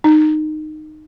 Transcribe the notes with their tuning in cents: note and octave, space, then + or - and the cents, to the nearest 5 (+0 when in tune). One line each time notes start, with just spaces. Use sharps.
D#4 -15